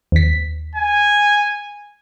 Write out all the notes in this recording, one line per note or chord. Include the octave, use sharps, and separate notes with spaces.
D#2 B6
G#5